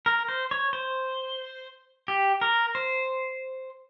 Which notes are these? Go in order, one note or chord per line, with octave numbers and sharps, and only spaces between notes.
A#4
C5
C#5
C5
G4
A#4
C5